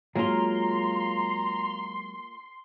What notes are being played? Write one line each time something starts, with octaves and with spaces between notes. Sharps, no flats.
F#3 G#3 A#3 F4 A#5 C6